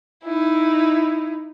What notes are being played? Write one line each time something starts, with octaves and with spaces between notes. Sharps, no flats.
D#4 E4